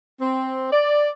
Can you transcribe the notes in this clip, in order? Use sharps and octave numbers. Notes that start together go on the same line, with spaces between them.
C4
D5